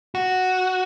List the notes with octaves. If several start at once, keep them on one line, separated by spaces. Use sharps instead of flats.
F#4